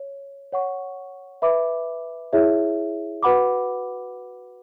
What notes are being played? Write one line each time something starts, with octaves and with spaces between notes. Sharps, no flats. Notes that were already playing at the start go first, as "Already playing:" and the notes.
Already playing: C#5
C#5 F#5 C#6
B4 E5 B5 D6
E4 G#4 C#5 E5
F#4 B4 F#5 B5 D6